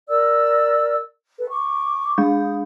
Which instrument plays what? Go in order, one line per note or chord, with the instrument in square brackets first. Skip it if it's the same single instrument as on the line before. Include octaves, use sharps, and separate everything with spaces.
[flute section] A#4 D5 E6
A4 B4
C#6 D6
[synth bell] G#3 D4 G6 [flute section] D#6